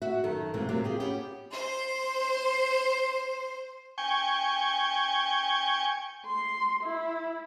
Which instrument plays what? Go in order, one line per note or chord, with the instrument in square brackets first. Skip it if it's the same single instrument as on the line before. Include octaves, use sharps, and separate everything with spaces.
[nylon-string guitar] F#4 E5
F#2 D#3 A4
G#2 C3 E3 C4 F4
C3 F#3 A#3 C4 F4 G4
F4 G4 G#4
B3 C#4 G4
[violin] C5 C6
[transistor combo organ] G5 G#5 C#6
[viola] C6
E4